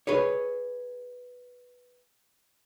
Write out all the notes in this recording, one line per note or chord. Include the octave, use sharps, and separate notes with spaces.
G#4 B4 C#5